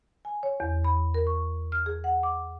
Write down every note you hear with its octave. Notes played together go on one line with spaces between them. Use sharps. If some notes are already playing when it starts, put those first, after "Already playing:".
G#5
C#5
E2
B5
A#4
C#6
F6
G#4
F#5
D6